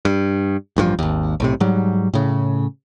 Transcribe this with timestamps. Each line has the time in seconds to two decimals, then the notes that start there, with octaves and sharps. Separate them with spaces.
0.05 G2
0.76 A1 G2 D3 F3
0.99 G#1 D#2
1.40 B1 A2 C3
1.60 G#2 F#3 G3
2.13 A2 C#3